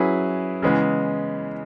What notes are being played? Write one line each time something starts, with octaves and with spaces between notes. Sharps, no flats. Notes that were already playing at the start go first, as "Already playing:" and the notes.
Already playing: F#3 C#4 E4 G#4 B4
C#3 E3 G#3 B3